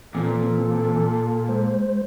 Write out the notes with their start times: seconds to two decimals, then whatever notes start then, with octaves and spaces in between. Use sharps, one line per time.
0.15 A#2 E3 C4 A4
1.49 G#3 C5